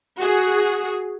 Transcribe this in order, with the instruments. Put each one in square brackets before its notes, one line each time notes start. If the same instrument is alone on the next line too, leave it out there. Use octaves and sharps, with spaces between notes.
[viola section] F#4 G#4